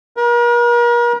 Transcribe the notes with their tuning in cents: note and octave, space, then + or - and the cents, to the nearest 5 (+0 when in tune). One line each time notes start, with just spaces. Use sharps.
A#4 +40